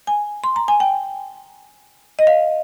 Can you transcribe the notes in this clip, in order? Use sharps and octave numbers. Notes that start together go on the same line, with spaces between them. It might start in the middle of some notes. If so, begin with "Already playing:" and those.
G#5
C6
A#5
G#5
G5
D#5
F5